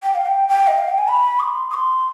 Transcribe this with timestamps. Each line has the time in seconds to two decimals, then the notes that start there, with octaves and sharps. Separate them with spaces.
0.03 G5
0.15 F5
0.26 G5
0.49 G5
0.67 D#5
0.78 F5
0.88 G5
0.98 G#5
1.09 B5
1.39 D#6
1.43 C6
1.70 D#6
1.74 C6